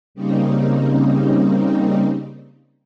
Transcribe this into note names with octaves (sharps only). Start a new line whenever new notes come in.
C#3 G3 A#3 C4 C#4 D#4